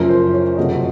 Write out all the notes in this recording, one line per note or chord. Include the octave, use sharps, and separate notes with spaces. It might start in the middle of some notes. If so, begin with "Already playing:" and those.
Already playing: F#1 F#2 F3 A#4
C5
C#5
F#1 F2 C3 F#3 D#5